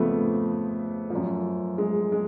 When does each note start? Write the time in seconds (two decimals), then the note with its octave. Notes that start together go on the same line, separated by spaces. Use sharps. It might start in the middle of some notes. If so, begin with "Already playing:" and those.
Already playing: F2 C#3 F3 A3 B3
1.10 F#2 F3
1.78 G#3
2.12 G#3